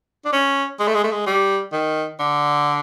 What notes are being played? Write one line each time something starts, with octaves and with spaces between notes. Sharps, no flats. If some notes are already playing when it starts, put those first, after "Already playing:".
D4
C#4
G#3
A3
G#3
A3
G#3
G3
D#3
D3